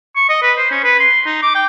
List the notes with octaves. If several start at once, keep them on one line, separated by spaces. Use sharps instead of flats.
C#6
D#5
B4
C5
C#4
B4
C6
D#4
D6
G5